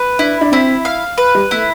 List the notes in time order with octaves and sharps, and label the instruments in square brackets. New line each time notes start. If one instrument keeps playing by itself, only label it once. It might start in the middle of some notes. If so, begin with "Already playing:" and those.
Already playing: [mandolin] B4
[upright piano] D4 [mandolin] E4
[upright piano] D4
[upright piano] C4 [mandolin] E4
[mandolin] F5
B4
[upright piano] G3
[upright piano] A3 [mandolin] E4